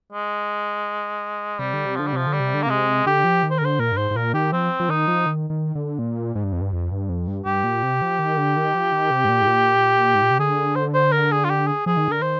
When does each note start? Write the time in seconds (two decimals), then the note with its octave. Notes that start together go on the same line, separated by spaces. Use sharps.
0.12 G#3
1.59 C3 G3
1.73 D3
1.86 C3
1.96 D3 F3
2.07 G3
2.13 C3 F3
2.27 D3
2.33 G3
2.40 C3
2.54 D3
2.62 A#3
2.67 C3 G#3
3.06 D3 G4
3.24 F3
3.43 D#3
3.51 C5
3.58 A#4
3.61 D3 C5
3.79 A#2 A#4
3.92 G2
3.97 G#2 C5
4.11 G#2
4.15 A#2 A#4
4.34 D#3 G4
4.52 F3 C4
4.80 F3
4.89 D#3 D#4
5.08 F3
5.26 D#3
5.50 D#3
5.75 D3
5.99 A#2
6.35 G#2
6.44 G2
6.53 F2
6.61 G2
6.73 F2
6.92 G2
7.09 F2
7.28 G2
7.46 G2 G4
7.64 A#2
7.83 C3
8.02 F3
8.19 D#3
8.37 D3
8.57 D#3
8.75 F3
8.92 D#3
9.11 C3
9.25 G#2
9.29 A#2
9.42 G#2
9.47 A#2
10.15 G#2
10.22 A#2
10.31 C3
10.39 D3 G#4
10.75 C5
10.94 C5
11.12 A#4
11.32 G#4
11.45 F4
11.50 G4
11.67 G#4
11.86 F3 G#4
11.97 D#3
12.08 D3 A#4
12.20 D#3 C5